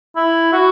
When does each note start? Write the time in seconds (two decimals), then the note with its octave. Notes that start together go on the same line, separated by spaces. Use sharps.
0.16 E4
0.53 F#4